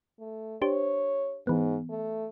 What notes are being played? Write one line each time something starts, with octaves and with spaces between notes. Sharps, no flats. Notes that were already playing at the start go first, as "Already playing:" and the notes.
A3
D4 G4 C5 C#5
G#2 E3 B3
A3